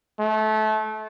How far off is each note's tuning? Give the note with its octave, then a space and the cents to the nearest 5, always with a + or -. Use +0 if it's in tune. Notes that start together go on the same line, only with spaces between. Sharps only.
A3 -25